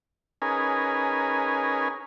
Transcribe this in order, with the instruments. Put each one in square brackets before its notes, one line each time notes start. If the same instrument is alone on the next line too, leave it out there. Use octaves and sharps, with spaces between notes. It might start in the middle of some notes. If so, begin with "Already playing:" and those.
[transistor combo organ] C#4 D#4 G#4 A#4 B4 G#5